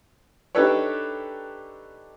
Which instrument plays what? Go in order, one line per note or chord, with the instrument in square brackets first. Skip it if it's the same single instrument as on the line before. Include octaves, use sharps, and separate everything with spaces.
[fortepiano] D4 D#4 G4 A4 B4 C#5